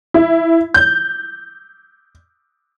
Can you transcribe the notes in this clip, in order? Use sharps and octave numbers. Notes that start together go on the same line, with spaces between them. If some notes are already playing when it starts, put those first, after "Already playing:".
E4
G6